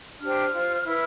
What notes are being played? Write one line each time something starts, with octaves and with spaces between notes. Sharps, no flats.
D4 G4 C5 F6
F4 C5
E4 B4